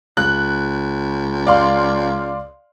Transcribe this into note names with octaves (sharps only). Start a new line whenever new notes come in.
C#2 F#6
D5 F5 C6